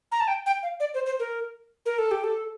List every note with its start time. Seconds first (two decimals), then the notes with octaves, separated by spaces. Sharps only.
0.12 A#5
0.20 A5
0.28 G5
0.46 G5
0.63 F5
0.80 D5
0.94 C5
1.06 C5
1.20 A#4
1.86 A#4
1.98 A4
2.11 G4
2.24 A4